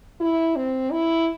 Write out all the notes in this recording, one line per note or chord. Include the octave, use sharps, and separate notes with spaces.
E4
C4
E4